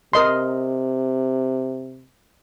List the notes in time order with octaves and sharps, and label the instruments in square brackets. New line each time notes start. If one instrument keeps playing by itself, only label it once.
[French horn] C3 [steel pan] A#4 D#5 C6